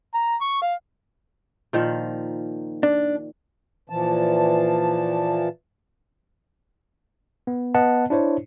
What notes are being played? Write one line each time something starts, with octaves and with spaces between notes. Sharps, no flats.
A#5
C#6
F5
A#2 D#3 F3
D4
A#2 E3 F3 A5
B3
B3 D#5 F#5 A5
D4 E4 C5 C#5